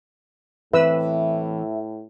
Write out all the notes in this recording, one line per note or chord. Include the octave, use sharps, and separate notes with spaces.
A2 E3 C4 B4 E5 E6